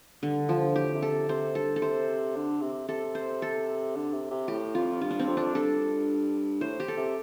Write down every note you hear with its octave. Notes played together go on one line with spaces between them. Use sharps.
G2 D3
F3
A2 G4
C3
A4
C3
C3 C5
G2 A4
A4
C3 C5
D3
C3
C3 A4
C5
A4
D3
C3
C3
A2 G4
F2 F4
G2 F4
D4
C4
F2
D4
G2 A4
A2 C5
G4
A4
C3